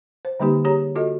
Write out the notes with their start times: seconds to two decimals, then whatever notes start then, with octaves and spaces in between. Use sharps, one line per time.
0.25 C5
0.40 D3 G3 A#3 D#4 G4
0.65 G4 G#4 C#5 A#5
0.95 F4 F#4 A4 D#5